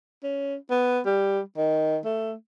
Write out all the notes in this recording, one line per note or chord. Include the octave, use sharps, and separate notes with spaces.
C#4
B3
G3
D#3
A3